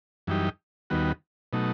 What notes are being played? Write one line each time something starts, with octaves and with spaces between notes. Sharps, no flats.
F#2 E3 G3 D#4 G4
D#2 D#3 G3 B3 F#4
B2 F#3 A3 D#4